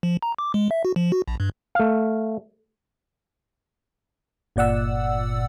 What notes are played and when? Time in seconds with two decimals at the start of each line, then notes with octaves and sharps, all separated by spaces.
0.03 F3
0.23 A#5
0.38 D6
0.54 G#3
0.71 E5
0.85 F#4
0.96 F3
1.12 F#4
1.28 A#1
1.40 G2
1.75 A3 F5
4.56 G1 A#2 D5 F#5 E6